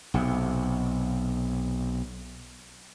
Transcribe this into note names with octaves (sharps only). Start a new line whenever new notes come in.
B1 C3